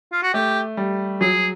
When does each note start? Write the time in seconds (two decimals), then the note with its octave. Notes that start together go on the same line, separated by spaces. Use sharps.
0.12 F4
0.23 F#4
0.34 A3 G4
0.77 G3
1.21 F#3 G#4